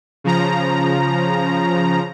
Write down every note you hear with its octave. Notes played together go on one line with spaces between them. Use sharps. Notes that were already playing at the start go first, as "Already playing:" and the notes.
C#3 F3 A#5